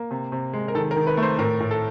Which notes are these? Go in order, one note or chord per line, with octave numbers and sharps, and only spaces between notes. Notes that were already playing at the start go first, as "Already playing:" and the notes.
Already playing: A#3
C3
C3
G#3
A#4
D#3 A4
A#4
D#3
B4
A3
C5
A2 A#4
A2
A4